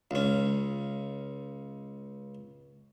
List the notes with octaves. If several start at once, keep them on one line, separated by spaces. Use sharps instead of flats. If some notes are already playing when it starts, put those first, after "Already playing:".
C#2 C#4